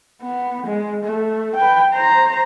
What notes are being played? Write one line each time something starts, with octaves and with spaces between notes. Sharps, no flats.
B3
G#3
A3
B4 G5
C5 A#5